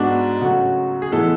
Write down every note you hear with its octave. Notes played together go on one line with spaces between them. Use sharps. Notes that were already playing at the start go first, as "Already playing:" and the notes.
Already playing: G#2 G#3 B3 D4 F#4
C#3 F#3 A3 F#4
G#4
A2 E3 G#3 B3 A4